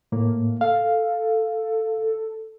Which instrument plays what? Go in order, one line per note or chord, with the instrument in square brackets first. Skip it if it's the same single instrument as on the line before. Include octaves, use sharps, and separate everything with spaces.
[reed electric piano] A2 A#3
[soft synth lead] A4 [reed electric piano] F5